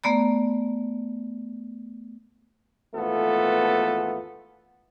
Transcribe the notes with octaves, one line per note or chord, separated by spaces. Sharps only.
A3 B3 D5 A#5
G#1 E2 A3 B3 F4 A4